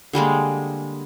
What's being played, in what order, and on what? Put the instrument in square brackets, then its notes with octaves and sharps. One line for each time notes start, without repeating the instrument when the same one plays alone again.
[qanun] D3 G3 G#3 A#3